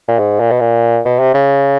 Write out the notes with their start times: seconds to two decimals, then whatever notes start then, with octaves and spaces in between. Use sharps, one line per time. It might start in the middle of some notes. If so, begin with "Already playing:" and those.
0.08 A#2
0.19 G#2
0.40 A#2
0.51 B2
0.60 A#2
1.05 B2
1.20 C3
1.34 C#3